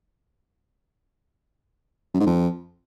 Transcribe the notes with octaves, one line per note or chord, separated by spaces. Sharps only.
F#2
G#2
F2